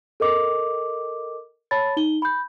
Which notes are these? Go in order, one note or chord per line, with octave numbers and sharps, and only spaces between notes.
A4 A#4 D#5 D6
C#5 A5 B5 A6
D#4 G7
B5 G6